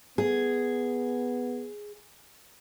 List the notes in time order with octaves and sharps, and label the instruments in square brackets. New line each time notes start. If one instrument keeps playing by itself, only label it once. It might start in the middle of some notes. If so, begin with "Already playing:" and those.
[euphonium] B3 [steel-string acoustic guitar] G#4